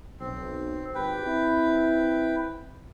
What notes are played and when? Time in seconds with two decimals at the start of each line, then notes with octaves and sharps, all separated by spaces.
0.20 B1 C4
0.95 G#1 G4 B4 G5
1.24 C4 E4